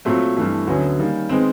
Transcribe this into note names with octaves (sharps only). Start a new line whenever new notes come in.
A#2 F#3 A3 C4
G2 E3 A3
D2 D3 F#3 B3 C#4
D#3 G3 A#3
D#3 G#3 B3 C4